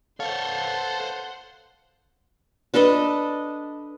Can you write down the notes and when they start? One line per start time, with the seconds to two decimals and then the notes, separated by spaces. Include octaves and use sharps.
0.20 A4 C5 C#5 F5 F#5 C6
2.74 D4 A4 B4 D#5